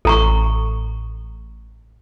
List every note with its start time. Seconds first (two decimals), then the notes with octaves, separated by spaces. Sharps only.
0.05 A1 A4 A#5 C#6